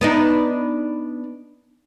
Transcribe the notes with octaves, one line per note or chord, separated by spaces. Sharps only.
B3 D4 D#4